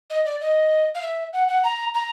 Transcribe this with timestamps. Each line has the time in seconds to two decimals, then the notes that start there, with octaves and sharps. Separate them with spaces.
0.10 D#5
0.25 D5
0.41 D#5
0.95 F5
1.02 E5
1.33 F#5
1.48 F#5
1.64 A#5
1.94 A#5